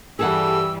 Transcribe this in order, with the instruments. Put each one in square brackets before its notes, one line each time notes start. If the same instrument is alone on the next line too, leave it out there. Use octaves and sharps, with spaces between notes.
[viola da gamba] G2 E3 G3 [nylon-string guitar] G#4 A4 F#5 [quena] E6